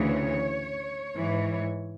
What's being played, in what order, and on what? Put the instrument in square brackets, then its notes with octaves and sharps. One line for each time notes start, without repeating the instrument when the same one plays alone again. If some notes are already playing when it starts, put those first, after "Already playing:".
Already playing: [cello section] D2 C#3 E3 C#5
G#2 E3